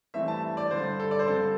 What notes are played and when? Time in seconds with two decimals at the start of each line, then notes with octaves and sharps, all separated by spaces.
0.14 G2 E3 A3 C4 E5
0.28 A5
0.57 D5
0.71 G2 D3 G3 C5
1.00 A4
1.11 D5
1.19 C5
1.28 G2 D3 C4 A4